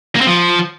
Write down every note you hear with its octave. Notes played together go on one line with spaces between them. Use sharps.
A#3
C4
F3